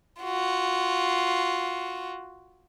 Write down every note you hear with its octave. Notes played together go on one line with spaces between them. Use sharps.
F4 F#4